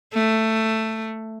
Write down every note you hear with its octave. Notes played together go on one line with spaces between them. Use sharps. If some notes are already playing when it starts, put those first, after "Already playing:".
A3